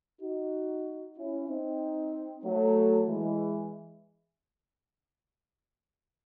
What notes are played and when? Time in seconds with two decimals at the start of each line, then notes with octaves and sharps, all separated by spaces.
0.21 D#4 F#4
1.17 C#4 E4
1.49 C4 D#4
2.44 F#3 A3
3.08 E3 G#3